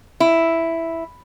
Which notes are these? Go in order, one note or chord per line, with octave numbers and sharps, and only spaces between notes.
E4